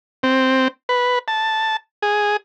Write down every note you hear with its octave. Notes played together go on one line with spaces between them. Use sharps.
C4
B4
A5
G#4